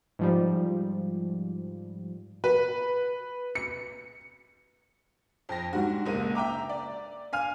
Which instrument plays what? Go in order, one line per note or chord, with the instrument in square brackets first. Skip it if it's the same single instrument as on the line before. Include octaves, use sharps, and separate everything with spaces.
[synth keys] G#2 F3 G3
[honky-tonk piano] B4
C#7
F2 A#6
G#2 G3 F#4
F#1 C#2 A#3 D#7
E5 G5 A#5 D6
D5
F5 G#5 F6